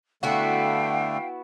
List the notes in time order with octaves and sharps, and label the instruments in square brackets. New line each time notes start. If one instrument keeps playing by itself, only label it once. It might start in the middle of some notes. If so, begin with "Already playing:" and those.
[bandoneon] D3 A3 [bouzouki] B3 E4 F#4 [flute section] F5 G5